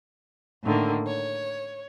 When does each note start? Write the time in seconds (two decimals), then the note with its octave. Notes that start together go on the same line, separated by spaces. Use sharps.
0.64 A2 D3 D#3 A#3
1.07 C#5